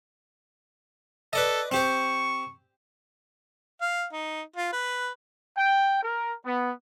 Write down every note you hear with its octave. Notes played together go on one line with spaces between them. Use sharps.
A4 B4 D5 D#5
C4 G4 C5 C#6
F5
D#4
F4
B4
G5
A#4
B3